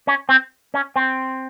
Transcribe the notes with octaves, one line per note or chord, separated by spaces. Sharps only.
C#4
C4
C#4
C4